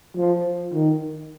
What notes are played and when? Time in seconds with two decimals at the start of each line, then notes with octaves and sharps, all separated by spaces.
0.16 F3
0.73 D#3